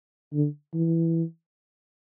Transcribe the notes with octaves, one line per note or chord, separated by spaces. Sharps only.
D3
E3